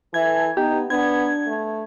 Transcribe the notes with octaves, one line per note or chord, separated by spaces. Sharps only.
E3 A4 E5 G#6
B3 D#4 G4
B3 D4 G#6
A3